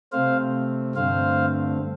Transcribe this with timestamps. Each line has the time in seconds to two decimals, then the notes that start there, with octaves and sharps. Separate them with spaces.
0.12 C3 A3 C4 C5 F5
0.95 G2 D3 A3 C4 C5 F5